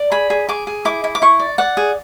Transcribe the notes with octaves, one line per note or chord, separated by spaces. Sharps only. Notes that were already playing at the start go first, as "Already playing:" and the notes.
Already playing: D5
G#4 B5
G#4
G#4 D6
G#4
E4 D6
E4
D6
E4 C#6
D5
D5 F#5
G#4